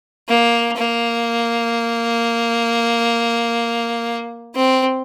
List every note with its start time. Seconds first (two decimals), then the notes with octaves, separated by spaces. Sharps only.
0.29 A#3
0.77 A#3
4.55 C4